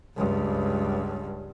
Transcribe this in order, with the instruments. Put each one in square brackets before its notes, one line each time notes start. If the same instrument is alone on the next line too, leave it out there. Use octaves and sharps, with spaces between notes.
[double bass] C#2 G2